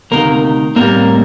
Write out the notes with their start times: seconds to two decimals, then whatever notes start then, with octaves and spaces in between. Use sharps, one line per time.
0.11 D2 C3 D#3 A#3 A#4
0.75 A2 G3 A#3 C4 A#4